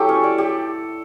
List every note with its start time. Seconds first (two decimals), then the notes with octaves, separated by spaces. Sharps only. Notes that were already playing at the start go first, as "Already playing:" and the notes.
Already playing: F#3 E4 G4 A4
0.09 C#4
0.24 D5
0.38 G4